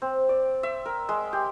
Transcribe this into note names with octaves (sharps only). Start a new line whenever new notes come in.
C4
D5
E5
A#4
G#3
G4